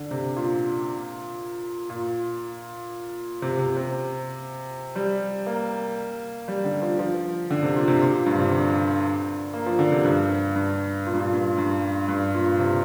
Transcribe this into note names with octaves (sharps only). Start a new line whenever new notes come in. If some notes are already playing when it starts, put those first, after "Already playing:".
Already playing: D3
C3
A#2
A#2
C3
C3
C3
G3
A#3
G3
D3
F3
F3
D3
C3
A#2
C3
A#2
A#2
G2
C3
D3
A#3
F3
D3
C3
G2
G2
A#2
G2
A#2
G2
G2
G2
A#2
C3